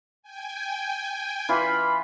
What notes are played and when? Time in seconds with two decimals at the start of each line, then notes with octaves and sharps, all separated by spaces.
0.22 G5 G#5
1.49 E3 F4 B5